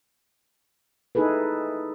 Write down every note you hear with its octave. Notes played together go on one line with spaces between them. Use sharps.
D#4 E4 G#4 A4 B4